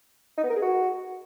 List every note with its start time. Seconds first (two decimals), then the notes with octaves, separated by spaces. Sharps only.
0.38 D#4
0.44 B3
0.50 A#4
0.56 G#4
0.63 F#4